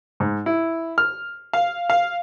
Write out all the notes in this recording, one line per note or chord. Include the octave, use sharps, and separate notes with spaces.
G#2
E4
F6
F5
F5